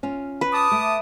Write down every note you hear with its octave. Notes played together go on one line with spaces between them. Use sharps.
C#4 F4
B4
A5 D6 D#6
A3